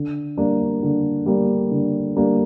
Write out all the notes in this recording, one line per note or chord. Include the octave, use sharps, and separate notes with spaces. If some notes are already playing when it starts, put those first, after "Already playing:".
Already playing: D3
G3 A#3 D4
D3
G3 A#3 D4
D3
G3 A#3 D4